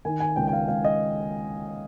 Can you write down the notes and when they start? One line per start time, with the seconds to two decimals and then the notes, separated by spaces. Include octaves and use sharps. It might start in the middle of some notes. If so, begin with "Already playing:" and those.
0.05 D#3 G#5
0.20 G#5
0.36 C#2 G5
0.47 G5
0.53 F5
0.68 C#2 F5
0.85 D#5